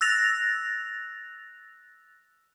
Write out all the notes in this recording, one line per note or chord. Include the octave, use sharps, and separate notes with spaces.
E6 F#6 A6 A#6 F7